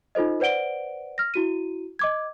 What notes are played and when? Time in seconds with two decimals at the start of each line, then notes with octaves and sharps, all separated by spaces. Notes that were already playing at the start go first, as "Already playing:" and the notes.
0.15 D#4 F4 A4 C5 D#5
0.40 B4 C5 D5 F#5 D7 G7
1.18 F6 A#6
1.34 E4 F#4 D#7
1.99 D#5 D6 G#6